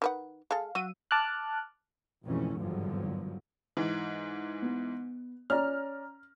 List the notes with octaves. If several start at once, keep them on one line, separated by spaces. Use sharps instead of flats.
D#3 B4 F#5
G#3 A4 F5
F#3 F#4 E6 D#7
A5 D6 F6 F#6
G#1 F2 B2 E3 A3 C#4
G#1 E2 G2 D3 F3 F#3
G#2 E3
B3
C#4 D5 A#5 F6